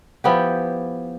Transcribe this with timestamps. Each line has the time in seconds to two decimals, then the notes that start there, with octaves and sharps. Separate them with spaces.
0.24 F3 B3 E4 G4